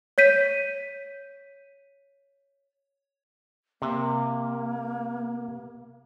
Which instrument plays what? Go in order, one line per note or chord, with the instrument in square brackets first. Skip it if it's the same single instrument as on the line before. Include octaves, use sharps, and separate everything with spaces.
[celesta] C#5 G6 B6 D#7
[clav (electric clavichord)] C3 [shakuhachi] A#3